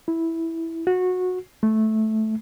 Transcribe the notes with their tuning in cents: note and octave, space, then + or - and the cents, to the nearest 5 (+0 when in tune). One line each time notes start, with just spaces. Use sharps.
E4 -5
F#4 -20
A3 -10